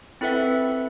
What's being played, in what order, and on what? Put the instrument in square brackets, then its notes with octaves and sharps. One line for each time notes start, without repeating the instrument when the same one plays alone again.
[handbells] C4 E4 A4 B4 E5 F#5